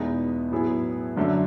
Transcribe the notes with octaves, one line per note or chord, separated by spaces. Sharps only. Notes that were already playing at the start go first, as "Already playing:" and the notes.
Already playing: E2 B2 G#3 B3 D#4
A2 F#3 B3 E4 G#4
F#2 D3 F#3 A3